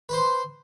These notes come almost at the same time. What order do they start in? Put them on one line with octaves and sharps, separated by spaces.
B4 C5 C6